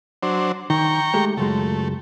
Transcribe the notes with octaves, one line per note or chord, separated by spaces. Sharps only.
F#3 D4 C5
D#3 G5 A#5 C#6
G#3 A3 G4
C#2 F#2 G#3 A3